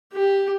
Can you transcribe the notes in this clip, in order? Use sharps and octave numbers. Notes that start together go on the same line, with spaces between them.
G4